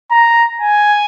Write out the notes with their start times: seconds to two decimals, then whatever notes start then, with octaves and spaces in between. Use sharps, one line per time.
0.11 A#5
0.61 G#5